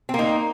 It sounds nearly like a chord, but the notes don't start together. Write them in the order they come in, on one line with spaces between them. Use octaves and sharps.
C4 A#3 D#4